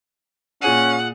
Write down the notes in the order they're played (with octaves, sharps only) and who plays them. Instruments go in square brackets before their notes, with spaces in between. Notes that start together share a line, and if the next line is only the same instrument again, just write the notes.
[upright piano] A#2 G#4 D#7 [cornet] C#4 [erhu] F#5